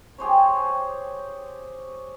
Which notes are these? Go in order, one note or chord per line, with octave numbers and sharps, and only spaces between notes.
G4 G#4 C5 C#5